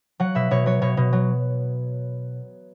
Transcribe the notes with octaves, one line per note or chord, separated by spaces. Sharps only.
F#3 F#5
B2 E5
B2 C#5
F#3 C#5
B2 C#5
B2
F#3